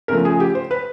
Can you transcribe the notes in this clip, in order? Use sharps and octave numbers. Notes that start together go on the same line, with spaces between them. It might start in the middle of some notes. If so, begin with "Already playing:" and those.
C#3 F3 A3 A#4
G#4
G4
C5
B4